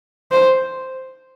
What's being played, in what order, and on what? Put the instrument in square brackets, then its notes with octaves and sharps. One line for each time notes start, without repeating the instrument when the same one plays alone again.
[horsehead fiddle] C5